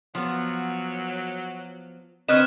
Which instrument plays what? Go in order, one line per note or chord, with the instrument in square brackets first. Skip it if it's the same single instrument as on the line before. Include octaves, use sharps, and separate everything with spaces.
[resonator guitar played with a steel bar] F3 B3 [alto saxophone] F#3
[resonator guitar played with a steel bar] D3 C#5 D#5 [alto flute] C4 [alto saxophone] B4 [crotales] F6 F#6 E7